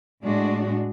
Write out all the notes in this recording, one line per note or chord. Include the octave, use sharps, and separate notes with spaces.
A2 G#3 D4 F#4